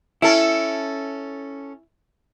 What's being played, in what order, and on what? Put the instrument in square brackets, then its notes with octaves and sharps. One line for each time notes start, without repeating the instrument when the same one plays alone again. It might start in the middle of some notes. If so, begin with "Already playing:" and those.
[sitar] C#4 A4 [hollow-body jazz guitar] E4